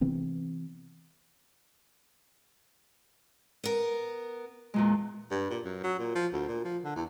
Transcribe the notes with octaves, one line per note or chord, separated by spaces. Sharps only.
C3 E3 B3 C4
B3 A#4
E2 A#2 G#3
G2
A#2
F#2
F#3
A#2
F3
D2
A#2
F3
D3
E2